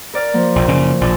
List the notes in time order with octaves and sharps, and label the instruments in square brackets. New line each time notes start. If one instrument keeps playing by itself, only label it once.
[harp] A#4 D5 F6
F3 A#3
[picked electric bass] A#1
F#1 C#3
[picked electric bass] A#1 [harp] A5 D6